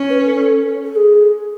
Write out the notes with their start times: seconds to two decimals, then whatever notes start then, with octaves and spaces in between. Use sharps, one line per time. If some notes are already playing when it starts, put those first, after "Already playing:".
Already playing: C#4
0.10 B4
0.26 A4
0.84 A4
0.96 G#4